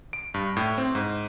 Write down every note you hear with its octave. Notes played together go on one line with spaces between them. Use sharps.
D7
G2
A2
C4
G#2